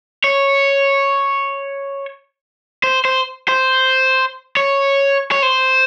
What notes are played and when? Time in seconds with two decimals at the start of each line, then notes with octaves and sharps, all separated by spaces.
0.24 C#5
2.84 C5
3.05 C5
3.48 C5
4.57 C#5
5.32 C#5
5.43 C5